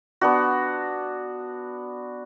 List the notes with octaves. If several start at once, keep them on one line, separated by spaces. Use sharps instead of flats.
B3 D4 F#4